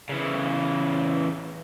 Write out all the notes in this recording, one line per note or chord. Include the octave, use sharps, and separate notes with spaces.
C#3 E3